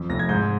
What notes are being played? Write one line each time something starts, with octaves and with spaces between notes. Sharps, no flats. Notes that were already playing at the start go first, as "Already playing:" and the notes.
Already playing: F2
F1 A#6
G#6
G#2 G6